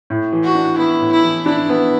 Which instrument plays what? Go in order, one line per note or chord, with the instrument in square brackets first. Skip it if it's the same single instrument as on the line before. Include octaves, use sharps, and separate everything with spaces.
[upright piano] A2
E3
[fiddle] F#4
[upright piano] D4
[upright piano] B3 [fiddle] E4
[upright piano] A2
[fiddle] E4
[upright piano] E3
[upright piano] D4 [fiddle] E4
[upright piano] B3